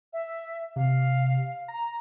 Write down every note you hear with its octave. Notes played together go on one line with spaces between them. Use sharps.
E5
C3 F5
A#5